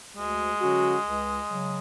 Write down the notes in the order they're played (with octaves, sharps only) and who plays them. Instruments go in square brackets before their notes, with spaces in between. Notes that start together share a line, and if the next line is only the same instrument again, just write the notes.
[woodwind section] D2 [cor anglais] G#3
[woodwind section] D3 F#3 C#4 F#4
C#2
C#3 F#3